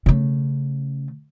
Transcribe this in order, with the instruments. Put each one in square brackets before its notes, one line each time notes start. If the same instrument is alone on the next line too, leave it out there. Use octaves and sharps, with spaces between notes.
[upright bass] C#3 A3